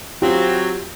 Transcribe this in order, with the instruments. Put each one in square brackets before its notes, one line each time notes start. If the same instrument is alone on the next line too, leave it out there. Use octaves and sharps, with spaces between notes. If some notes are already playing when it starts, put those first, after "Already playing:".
[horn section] F#3 C4 [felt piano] F4 G4 G5